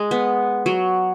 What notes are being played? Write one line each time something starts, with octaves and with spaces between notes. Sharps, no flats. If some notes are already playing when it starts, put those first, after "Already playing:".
Already playing: G#3
B3
F#3